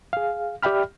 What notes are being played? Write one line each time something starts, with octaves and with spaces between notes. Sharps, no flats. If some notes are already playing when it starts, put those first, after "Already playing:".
G#4 F5
G4 D5 E5 G5 B5 F6